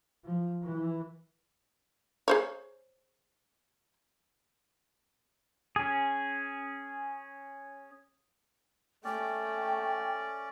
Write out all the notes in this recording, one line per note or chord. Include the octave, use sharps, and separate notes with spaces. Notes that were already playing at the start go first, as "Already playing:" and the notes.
F3
E3
G#4 C5 C#5
C#4 G#4
A3 C#4 D5 G5